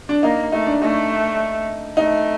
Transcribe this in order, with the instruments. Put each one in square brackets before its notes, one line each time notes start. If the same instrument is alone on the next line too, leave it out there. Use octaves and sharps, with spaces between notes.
[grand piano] D4
[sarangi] A#3 [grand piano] D#4
[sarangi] A3 [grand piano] D#4
[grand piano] D4
[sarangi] A3 [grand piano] D#4
[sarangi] A3 [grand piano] D#4